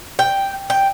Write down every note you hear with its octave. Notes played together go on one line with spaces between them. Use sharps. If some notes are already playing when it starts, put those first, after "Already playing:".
G5
G5